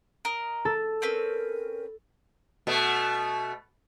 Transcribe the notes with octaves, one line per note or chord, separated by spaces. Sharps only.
A#4 D#5
A4
C4 C#4 A#4 B4
B2 A3